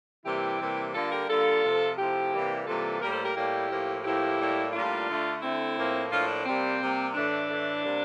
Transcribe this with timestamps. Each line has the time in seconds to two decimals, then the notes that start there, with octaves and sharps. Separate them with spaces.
0.24 C3 E3 G3 A#3 E4 G4
0.59 C3 E3 G3 A#3
0.93 D3 G3 A#3 F4 A4
1.11 G4 A#4
1.28 D3 G3 A#3 F4 A4
1.63 C3 F3 A3
1.97 C3 F3 A3 E4 G4
2.32 C3 E3 G3 A#3
2.66 C3 E3 G3 A#3 F4 A4
3.01 A2 G3 A#3 G4 A#4
3.12 A4 C5
3.24 G4 A#4
3.35 A2 G3 A#3 E4 G4
3.70 A2 F3 A#3
4.04 A2 F3 A#3 E4 G4
4.39 A2 G3 A#3
4.73 A2 G3 A#3 D4 F4
5.08 D3 A3
5.42 D3 A3 C4 E4
5.77 A2 F3 A#3
6.11 A2 F3 A#3 D4 F4
6.28 D4
6.46 C3 G3 A#3 C4
6.80 C3 G3 A#3
7.14 A2 E3 A3 D4
7.50 A2 E3 A3
7.84 C3 G3 A#3